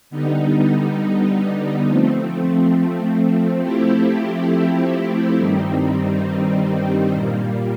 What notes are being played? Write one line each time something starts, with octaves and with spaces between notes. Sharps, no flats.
D3 G3 B3 D#4
F3 A3 C4
F3 A3 C4 E4 G4
G2 D#3 G3 C4 D#4
A#2 G3 A#3